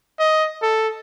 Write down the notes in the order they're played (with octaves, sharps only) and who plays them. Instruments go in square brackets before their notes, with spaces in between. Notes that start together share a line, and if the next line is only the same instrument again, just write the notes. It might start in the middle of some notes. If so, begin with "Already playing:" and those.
[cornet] D#5
A4